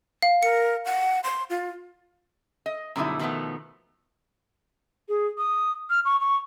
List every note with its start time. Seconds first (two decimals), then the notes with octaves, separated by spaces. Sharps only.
0.22 F5
0.43 A#4 C#7
0.85 F#5
1.24 C6
1.50 F4
2.66 D#5
2.96 F#2 B2 D3 G3 D#4 E4
3.19 B2 D#3 F3 G#3 A3 B3
5.09 G#4
5.38 D#6
5.90 F6
6.05 C#6
6.20 C#6